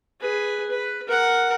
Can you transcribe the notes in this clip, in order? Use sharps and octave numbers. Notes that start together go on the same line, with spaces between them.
G#4 B4
B4
A#4 F#5